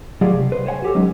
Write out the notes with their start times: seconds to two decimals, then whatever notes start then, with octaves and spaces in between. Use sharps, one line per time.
0.21 F#3 G3 A3 F4 G#4 D5
0.33 C3
0.52 B4 C5
0.66 C5 C#5 F#5 G#5
0.82 F#4 G4 A4
0.95 F#3 G#3 C#4 D#4